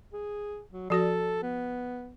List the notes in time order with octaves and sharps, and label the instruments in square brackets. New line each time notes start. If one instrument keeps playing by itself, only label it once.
[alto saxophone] G#4
F#3
[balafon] F3 F#4 D5 [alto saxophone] A4
[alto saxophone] B3